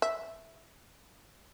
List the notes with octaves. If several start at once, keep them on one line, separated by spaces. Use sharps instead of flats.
E5